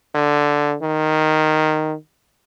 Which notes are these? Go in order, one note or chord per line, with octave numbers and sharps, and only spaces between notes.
D3
D#3